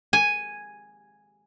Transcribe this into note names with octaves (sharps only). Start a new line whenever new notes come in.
G#5